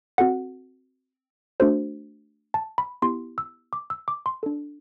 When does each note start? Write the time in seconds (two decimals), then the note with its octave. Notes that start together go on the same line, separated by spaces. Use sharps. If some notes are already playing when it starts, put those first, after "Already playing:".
0.18 C4 F#4 A4 F#5
1.60 A3 D4 F#4 A4 C5
2.54 A5
2.78 B5
3.02 B3 E4 G4 C6
3.38 E6
3.73 D6
3.90 E6
4.08 D6
4.26 C6
4.43 D4 A4